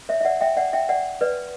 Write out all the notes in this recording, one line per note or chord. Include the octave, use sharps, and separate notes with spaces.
C#5 E5
E5
D5 F#5
E5 G5
D5 F#5
E5 G5
D5 F#5
B4 D5